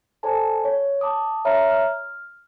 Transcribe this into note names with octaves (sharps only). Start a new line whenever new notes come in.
A4 C5 D5 G#5 A5
C#5
A5 D6 D#6
C#5 E5 A#5 F6
F6